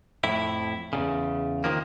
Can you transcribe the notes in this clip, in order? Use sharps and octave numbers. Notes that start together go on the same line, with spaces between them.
F2 A2 E4
E2 A#2 C#3
D#3 F3 A#3